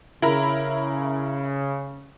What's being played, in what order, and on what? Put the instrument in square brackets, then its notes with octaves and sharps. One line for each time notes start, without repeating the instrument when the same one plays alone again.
[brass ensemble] C#3 [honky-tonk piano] E4 A#4 B5